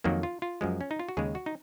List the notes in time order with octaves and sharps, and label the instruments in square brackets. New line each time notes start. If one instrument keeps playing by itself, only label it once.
[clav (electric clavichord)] F2 D#3 F#3 A#3
F4
F4
F#2 F3 G#3
C#4
D#4
F4
F#4
D#2 C#3 G#3 G#4
F#4
D#4